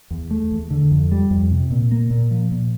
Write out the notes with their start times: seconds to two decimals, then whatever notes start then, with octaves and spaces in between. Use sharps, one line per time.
0.11 E2
0.31 A3
0.51 E2
0.70 D3
0.91 F2
1.12 G3
1.31 F2
1.51 C3
1.71 A#2
1.91 A#3
2.11 A#2
2.31 F3
2.51 A#2